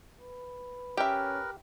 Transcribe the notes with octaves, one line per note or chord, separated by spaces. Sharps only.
B4
C#4 G4 A#4 B4 E5 G5